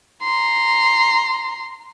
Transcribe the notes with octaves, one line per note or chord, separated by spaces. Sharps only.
A#5 C6